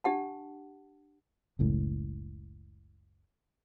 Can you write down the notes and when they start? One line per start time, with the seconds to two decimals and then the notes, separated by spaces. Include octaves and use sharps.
0.04 D4 G4 F#5 A5
1.59 F#1 C#2 A2